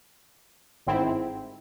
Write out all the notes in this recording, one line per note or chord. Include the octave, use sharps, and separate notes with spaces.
G1 G#2 D#3 C4 E4